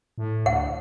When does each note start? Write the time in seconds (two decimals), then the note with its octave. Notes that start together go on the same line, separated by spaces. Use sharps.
0.18 A2
0.46 D2 F#5